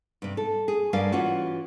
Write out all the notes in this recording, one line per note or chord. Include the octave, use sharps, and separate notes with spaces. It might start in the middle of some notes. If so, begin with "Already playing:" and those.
G2 C3
A4
G#4
G2 G3 C#4 D4 A#4 F5
E3 C#4 F4 F#4